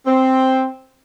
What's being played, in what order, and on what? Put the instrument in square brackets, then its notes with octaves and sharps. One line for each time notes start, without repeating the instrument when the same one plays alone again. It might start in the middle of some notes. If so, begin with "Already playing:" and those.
[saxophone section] C4